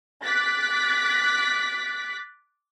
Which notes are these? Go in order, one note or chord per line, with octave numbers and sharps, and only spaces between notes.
D6 F#6 A6 B6